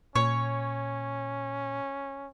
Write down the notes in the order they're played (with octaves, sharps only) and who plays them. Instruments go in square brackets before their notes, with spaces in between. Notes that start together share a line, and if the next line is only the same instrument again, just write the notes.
[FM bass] A#2 [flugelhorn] C#4 [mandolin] C#5